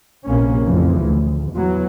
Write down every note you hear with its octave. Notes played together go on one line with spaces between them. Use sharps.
A#1 C3 A#3 C#4
F2 A2 C#3 E3 F3
D2
E2 E3 F#3